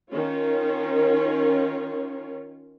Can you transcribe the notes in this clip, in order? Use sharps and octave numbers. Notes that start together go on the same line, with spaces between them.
D#3 C#4 F4 C#5